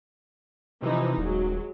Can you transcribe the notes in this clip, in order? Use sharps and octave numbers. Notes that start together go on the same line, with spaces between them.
C3 E3 F3 D#4
D#1 F#3 G#3